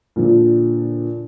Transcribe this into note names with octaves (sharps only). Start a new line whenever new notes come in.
A#2 D3 F3